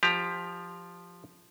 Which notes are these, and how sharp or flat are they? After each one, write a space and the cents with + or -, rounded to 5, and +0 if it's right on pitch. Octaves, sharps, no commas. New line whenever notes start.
F3 +0 G4 +15 A#5 +10